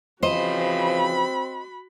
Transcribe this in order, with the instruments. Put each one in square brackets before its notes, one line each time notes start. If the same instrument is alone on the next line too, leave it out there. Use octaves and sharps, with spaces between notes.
[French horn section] C#3 E3 F3 [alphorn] C4 [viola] F#4 B5 [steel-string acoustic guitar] C5 D#5